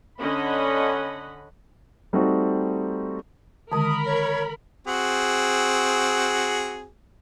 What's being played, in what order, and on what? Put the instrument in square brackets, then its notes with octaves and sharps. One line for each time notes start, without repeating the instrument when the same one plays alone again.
[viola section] D3 C#4 D#5 F#5 B5
[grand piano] G3 A3 C4 D#4 F#4
[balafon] D3 D#3 G#3 [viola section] A#4 B5 [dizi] D#6
[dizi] C#5
[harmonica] C4 F#4 G#4